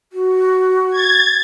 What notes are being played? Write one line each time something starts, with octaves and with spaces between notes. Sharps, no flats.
F#4
G#6 A6